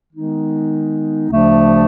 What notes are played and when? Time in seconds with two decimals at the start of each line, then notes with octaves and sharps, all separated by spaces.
0.13 D#3 G#3 B3 D#4
1.29 D2 C#3 F3 A3 D4